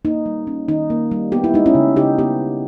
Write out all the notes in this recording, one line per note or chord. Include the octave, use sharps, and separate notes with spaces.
A#3 D#4
G3
C#4
D#3 D#4
A#3
G3
B3 G4
E4
G#3 D#4
C#4 E4
C#3
C#3 D#4 G4
B3 G4